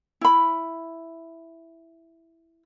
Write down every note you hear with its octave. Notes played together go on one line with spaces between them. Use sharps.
E4 B5